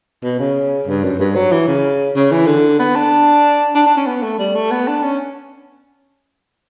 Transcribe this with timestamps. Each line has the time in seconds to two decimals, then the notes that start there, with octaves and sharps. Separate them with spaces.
0.23 B2
0.39 C#3
0.87 G2
1.04 F#2
1.19 G2
1.35 F#3
1.52 E3
1.67 C#3
2.15 C#3
2.31 E3
2.47 D3
2.79 B3
2.96 D4
3.75 D4
3.86 D4
3.97 C#4
4.06 B3
4.22 A3
4.39 G3
4.55 A3
4.71 B3
4.88 D4
5.03 C#4